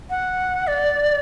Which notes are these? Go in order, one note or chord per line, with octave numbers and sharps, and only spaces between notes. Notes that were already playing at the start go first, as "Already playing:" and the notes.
F#5
D5